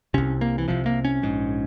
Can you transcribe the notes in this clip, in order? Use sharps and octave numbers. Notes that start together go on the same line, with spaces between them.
C2 C3 C#4
A#3
E3
C2 C3 F3
A#3
C#4
A#1 G#2